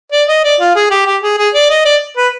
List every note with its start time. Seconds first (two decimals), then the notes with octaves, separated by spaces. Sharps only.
0.12 D5
0.29 D#5
0.44 D5
0.60 F4
0.75 G#4
0.91 G4
1.06 G4
1.23 G#4
1.38 G#4
1.54 D5
1.70 D#5
1.85 D5
2.17 B4